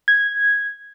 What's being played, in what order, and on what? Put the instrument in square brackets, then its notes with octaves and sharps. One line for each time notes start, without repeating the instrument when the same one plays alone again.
[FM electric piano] G#6